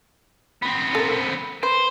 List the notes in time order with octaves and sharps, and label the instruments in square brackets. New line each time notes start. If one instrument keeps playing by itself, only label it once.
[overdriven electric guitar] B3 C4
[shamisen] A4 A#4
[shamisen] B4 [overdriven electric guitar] C5